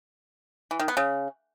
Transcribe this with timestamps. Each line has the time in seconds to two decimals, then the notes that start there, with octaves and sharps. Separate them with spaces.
0.71 E3
0.79 D#3
0.88 B3
0.97 C#3